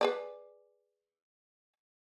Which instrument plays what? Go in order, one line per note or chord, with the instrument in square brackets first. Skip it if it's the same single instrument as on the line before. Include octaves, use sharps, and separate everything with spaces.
[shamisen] G#4 B4 D5